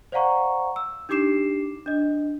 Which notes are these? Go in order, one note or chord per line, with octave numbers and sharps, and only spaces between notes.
C5 D5 F5 F#5 A#5 C#6
E6
D4 D#4 G4 D6 C7 E7
D4 D#5